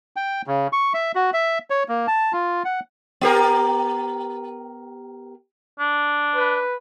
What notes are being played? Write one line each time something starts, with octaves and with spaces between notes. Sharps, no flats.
G5
C#3
C#6
E5
F#4
E5
C#5
A#3
A5
F4
F#5
B3 G4 A#4
D4
B4